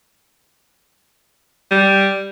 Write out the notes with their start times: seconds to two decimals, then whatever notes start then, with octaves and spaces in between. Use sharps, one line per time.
1.71 G3